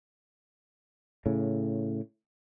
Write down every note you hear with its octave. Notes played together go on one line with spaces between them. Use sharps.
A2 C#3